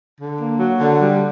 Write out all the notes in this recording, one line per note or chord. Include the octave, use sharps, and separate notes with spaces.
D3
A#3
F#3
D3
G3